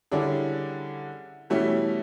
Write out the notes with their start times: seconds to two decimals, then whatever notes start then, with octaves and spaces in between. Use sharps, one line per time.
0.11 D3 G3 C#4 D4 E4 G#4
1.50 B2 E3 G3 A3 C#4 E4